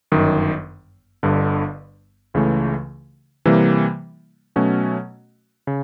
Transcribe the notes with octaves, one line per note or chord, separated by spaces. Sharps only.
G1 F#2 D#3
G1 G2 D3
C#2 C#3 E3 A3
C3 E3 G3 A#3
B2 F#3 A3 C#4 F#4
C#3